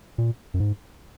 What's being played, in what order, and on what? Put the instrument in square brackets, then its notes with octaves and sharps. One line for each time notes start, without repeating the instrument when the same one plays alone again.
[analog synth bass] A#2
F#2
G#2